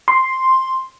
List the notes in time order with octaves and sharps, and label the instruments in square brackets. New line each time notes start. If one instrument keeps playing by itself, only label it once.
[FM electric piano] C6